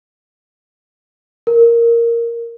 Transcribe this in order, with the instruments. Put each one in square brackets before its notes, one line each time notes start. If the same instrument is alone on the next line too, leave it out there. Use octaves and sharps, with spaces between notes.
[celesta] A#4